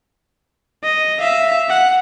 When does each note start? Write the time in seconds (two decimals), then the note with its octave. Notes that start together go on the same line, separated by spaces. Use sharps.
0.83 D#5
1.19 E5 F5
1.69 F#5